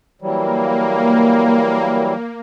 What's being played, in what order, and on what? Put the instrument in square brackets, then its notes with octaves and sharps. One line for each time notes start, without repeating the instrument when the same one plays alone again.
[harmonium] E3 F#3 G3 [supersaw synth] A#3